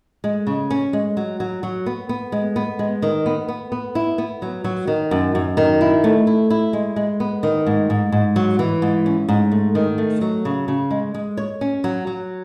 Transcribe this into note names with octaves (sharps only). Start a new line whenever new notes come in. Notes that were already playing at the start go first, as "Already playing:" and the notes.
G#3
C#3
C#4
G#3
F#3
F#3
F#3
B3
B3
G#3
B3
G#3
D#3
B3
B3
B3
E4
B3
F#3
F#3
D#3
F#2
F#2
D#3
E4
A3
E4
E4
G#3
G#3
B3
D#3
G#2
G#2
G#2
F#3
E3
G#2
C#4
G#2
A3
D#3
A3
F#3
C#3
C#3
G#3
G#3
C#5
C#4
F#3
F#3